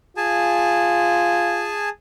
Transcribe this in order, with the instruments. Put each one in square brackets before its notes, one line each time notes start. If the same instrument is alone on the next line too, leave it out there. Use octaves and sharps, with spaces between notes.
[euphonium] F4 [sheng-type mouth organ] G#4 G#5 A5